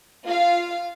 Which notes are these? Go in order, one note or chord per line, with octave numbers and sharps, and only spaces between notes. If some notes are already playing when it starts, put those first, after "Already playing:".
F4 F5